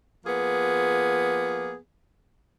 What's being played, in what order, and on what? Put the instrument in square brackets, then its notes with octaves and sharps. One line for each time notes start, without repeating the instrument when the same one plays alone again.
[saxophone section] F3 A#3 B3 G#4